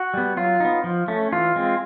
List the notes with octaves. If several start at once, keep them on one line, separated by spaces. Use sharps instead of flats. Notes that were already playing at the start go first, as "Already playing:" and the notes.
Already playing: F#4
G3 B3
F#3 F4
B3 D#4
F3
A3 C#4
E3 F4
G#3 C4